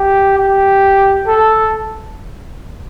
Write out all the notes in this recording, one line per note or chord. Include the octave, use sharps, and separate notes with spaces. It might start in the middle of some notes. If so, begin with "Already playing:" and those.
Already playing: G4
G4
A4